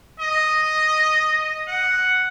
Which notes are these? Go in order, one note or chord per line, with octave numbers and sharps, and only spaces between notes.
D#5
F#5